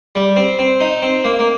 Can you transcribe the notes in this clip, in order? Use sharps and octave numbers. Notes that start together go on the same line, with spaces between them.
G3
C4
C4
D#4
C4
A#3
A#3